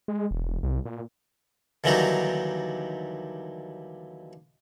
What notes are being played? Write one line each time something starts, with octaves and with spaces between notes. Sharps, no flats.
G#3
E1
C2
A#2
D#2 D3 E3 F#3 G3 D#4